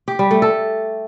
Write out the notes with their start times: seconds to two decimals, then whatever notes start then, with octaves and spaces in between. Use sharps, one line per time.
0.08 G4
0.19 G3
0.31 A3
0.42 A4